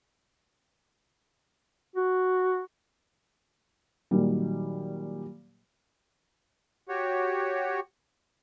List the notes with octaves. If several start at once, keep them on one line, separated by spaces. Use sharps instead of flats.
F#4
A#2 D#3 F#3 G3
F#4 G4 C#5